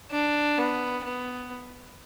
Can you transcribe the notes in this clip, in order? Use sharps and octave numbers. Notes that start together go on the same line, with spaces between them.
D4
B3
B3